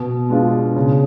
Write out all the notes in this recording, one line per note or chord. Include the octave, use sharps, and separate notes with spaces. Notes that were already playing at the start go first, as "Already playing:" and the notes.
Already playing: B2
G#3 B3 D4 F4
C#3